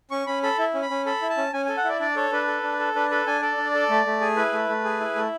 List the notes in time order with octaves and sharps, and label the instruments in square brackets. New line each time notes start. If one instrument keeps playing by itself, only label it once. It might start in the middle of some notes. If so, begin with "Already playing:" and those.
[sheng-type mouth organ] C#4 C#6
C#4 B5
A4 B5
E4
C#4
B5
C#4
A4 B5
E4
A5
C#4
C#4 G#5
A4 G#5
F#5
E4 D5
D4 D5
A4 C#5
D4 B4
A4
D4
A4
D4 B4
A4 B4
D4 G#5
A4 D5
D4
A4
A3
A3
G#4
E4 B4
A3
A3
G#4
E4
A3